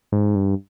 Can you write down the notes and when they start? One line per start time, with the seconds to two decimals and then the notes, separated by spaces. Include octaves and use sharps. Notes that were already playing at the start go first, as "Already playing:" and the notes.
0.12 G#2
0.35 G2